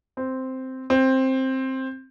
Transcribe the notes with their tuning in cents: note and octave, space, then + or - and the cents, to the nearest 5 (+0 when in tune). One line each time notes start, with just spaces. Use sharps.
C4 -5
C4 +10